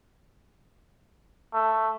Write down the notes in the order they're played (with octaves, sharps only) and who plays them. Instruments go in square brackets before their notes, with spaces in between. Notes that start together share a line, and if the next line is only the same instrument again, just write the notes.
[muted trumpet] A3